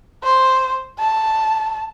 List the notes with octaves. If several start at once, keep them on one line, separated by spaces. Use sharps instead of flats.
C5
A5